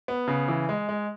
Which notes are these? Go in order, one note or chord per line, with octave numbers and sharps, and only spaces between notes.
B3
C#3
E3
G#3
G#3